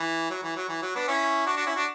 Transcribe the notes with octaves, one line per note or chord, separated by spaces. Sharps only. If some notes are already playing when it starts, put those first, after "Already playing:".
Already playing: E3
F#3
E3
F#3
E3
F#3
B3 D4
C#4 E4
D4 F#4
D4 F#4
C#4 E4
D4 F#4